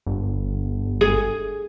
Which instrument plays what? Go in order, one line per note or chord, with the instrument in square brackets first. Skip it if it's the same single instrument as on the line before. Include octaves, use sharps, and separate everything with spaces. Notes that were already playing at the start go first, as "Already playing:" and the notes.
[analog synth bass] G1
[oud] G#4